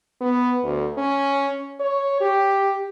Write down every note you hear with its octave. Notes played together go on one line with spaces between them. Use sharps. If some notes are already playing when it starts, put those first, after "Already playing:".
B3
D2
C#4
C#5
G4